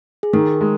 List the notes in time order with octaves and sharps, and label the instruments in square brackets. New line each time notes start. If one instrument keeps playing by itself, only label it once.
[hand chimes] G#4
[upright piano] D#3 [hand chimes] A#4
[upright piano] G#3